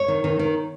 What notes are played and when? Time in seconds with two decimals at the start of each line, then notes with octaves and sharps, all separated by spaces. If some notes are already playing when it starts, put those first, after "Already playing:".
Already playing: C#5
0.08 D#3
0.24 D#3
0.39 D#3